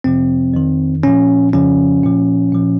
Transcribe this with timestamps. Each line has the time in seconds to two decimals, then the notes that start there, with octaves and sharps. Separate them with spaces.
0.04 F2 C3 F3 C4
0.54 F2 D#3
1.03 A#2 F3 C#4
1.53 F2 C#3 F3 C#4
2.04 A#2 F3
2.53 A#2 F3